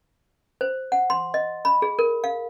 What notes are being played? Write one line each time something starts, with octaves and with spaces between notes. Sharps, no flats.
C5
F#5
C6
D#5
B5
G#4
A#4
F5